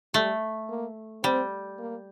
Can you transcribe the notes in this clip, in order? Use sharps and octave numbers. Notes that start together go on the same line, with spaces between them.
G3 A3
A#3
G3 C4
A#3